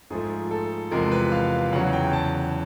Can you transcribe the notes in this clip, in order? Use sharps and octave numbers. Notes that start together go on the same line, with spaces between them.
G#2 F3 A3 G#4
A4
E2 C3 F3 G#3 A#4
B4
F5
E2 C#3 F#3 F#5
G5
A5